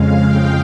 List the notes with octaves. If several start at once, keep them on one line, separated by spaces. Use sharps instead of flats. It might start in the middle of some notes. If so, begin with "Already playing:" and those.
Already playing: F2 C#3 G#3 F5
G5